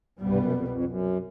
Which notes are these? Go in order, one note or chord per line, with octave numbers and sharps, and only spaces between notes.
C2 G2 B2 G3 B3
F#2
F2
F2
F#2